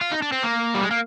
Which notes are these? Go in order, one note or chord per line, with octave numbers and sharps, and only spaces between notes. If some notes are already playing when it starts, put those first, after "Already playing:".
F4
D#4
D4
C4
A#3
G3
G#3
A#3